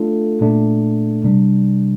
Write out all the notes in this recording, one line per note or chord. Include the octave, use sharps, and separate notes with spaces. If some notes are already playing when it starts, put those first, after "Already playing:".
Already playing: A3 D4 F4 A4
A#2 A3 D4
C3 G3 D4